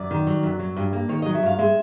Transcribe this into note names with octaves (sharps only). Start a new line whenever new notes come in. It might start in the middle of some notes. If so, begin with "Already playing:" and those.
Already playing: F#2 D5
D#3
F#3
F#2
F#3
G2
A#3
D#3 C#5
F#3 D#5
E5
G2 F5
G#3 E5